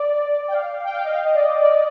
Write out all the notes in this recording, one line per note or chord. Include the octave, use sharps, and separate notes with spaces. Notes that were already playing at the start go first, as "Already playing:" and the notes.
Already playing: D5
G5
F5
G5
F5
D#5
F5
D#5
D5
D5
D5